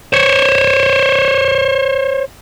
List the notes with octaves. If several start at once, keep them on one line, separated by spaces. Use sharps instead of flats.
C5 C#5